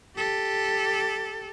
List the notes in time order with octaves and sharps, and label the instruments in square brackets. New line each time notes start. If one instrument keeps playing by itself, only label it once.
[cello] G4 A4